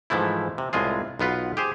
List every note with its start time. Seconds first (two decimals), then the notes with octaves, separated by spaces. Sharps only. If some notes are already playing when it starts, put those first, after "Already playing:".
0.10 G#2 E3 F3 A3 E4
0.58 C3
0.73 C2 A2 G#3 F4 G#4
1.19 B1 B3 F4 B4
1.57 G4 G#4 C5